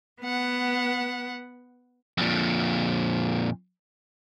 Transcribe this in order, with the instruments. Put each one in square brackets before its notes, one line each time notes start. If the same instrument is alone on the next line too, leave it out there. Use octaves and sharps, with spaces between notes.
[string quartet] B3 F#5
[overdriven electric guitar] F2 A#2